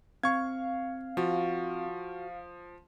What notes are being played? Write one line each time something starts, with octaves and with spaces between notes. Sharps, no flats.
C4 F5 C#6 G#6
F3 F4 F#4